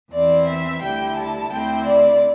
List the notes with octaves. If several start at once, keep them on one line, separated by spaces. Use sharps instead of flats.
E2 E3 C4 E4 D5
E5
D2 D3 G3 E4 G5
A5
D2 D3 C4 E4 G5
D5